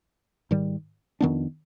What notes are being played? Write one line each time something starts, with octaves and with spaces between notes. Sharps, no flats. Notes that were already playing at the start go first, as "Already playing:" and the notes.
G#2 D#3 G3
F2 D#3 B3 D4